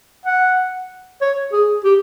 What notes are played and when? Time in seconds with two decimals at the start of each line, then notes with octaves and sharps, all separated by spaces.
0.25 F#5
1.21 C#5
1.52 G#4
1.84 G4